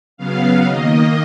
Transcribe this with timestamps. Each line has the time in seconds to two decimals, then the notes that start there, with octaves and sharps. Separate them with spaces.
0.17 C#3 F#3 B3 F5
0.65 D#3 A#3 D#5